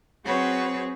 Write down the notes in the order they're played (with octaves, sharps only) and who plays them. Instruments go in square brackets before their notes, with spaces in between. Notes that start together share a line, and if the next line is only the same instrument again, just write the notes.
[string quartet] F#3 C4 F#4 G#4 B4 C#5